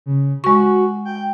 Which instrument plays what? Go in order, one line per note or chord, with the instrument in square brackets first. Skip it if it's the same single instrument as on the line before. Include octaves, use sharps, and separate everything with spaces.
[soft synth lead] C#3
[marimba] G#3 C#6 [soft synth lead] F#4
[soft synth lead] G5